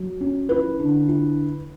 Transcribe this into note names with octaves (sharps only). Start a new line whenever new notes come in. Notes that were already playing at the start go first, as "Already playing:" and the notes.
Already playing: F#3
C#4
E4 B4
D3
E4